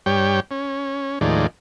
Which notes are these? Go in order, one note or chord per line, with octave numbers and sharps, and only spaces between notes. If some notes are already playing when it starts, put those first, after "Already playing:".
G2 G3 C#5 G5
C#4
D#2 A2 D#3 F3 G#3 D5